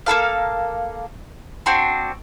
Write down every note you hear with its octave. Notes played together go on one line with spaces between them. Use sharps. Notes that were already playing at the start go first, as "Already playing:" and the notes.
A#3 C#4 A4 F5
C4 D4 F#4 C6